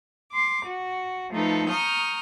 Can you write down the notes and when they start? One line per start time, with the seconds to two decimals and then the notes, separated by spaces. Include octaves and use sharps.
0.33 C6 D6
0.66 F#4
1.32 F3 A3 D#4 A4 B4
1.69 A#5 C#6 D#6 F6 G6